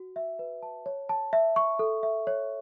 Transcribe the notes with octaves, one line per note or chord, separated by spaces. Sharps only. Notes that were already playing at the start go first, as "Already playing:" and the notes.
Already playing: F#4
E5
B4
A5
C#5
A5
E5
C#6
A4
E5
C#5